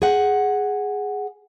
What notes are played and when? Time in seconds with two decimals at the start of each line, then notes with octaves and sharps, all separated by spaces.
0.02 G#4 F#5